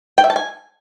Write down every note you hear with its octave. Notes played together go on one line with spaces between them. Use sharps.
G5
E5
A5
G#5